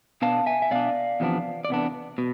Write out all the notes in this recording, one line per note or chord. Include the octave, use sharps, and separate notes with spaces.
B2 B3 D4 F5 A5
E5 G#5
E5
B2 B3 D4 D5 F5
E2 C3 F3 B3 D4
D5
E2 C3 B3 D4
B2